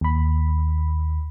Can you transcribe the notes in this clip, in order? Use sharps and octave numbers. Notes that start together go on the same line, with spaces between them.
D#2 B5